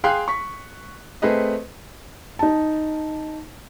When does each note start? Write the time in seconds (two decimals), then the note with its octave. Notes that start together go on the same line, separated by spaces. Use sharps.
0.04 G#4 F5 G5 G#5 C6 F#6
0.28 C#6 B6
1.22 A3 C4 G#4 B4 D#5
2.39 D#4 A5